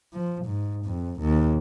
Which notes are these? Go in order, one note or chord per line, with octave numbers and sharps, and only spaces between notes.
F3
G#2
F2
D#2